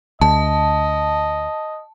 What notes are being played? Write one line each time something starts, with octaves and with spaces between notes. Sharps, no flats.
D2 D#5 A5